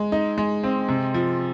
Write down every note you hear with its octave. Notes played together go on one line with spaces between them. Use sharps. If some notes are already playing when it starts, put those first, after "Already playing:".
Already playing: G#3
D#4
G#3
C4
C3
F3